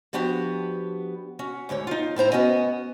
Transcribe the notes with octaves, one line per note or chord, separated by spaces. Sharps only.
F3 B3 D4 F#4 G4
C#4 F#4
D2 G#2 D3 C#5
D#4 F4
A2 E4 C5 A#5
B3 C#4 F#4 D#5 G5 G#5